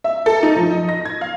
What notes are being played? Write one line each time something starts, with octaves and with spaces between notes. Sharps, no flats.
E5
A4
D#4
F3
D#5
A#6
G#6
F5